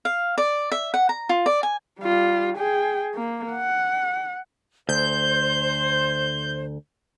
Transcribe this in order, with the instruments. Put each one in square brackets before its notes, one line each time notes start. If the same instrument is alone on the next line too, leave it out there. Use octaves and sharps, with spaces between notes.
[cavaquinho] F5
D5
E5
F#5
A#5
F4
D5
G#5
[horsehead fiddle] G3 F4
G#4 G5
A#3
F#5
[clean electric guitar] D2 [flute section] C5 [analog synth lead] G6